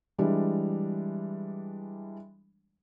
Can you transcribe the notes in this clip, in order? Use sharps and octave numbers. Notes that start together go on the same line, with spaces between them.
E3 G3 G#3 D4